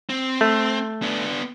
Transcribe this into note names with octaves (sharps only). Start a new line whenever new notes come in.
C4
A3
B3 D4